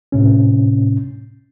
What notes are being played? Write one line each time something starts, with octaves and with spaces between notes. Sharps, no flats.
A2 C3 C#4